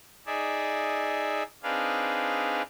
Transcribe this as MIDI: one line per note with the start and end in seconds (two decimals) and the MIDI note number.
0.26 1.43 63
0.26 1.43 68
0.26 1.43 74
0.26 1.43 76
1.63 2.62 60
1.63 2.62 62
1.63 2.62 63
1.63 2.62 68
1.63 2.62 71
1.63 2.62 77